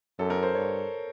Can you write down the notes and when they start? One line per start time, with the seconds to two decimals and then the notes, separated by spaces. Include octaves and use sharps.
0.19 F#2 A4
0.30 A#4
0.43 C5
0.55 G2 C#5